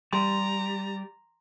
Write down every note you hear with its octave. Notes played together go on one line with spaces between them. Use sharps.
G3 A#5 C6